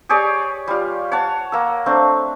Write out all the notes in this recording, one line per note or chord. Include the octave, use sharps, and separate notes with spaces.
G4 G#4 C#5 D5
G3 F4
C#5 F#5 A5
A#3 E6
A3 C4 D4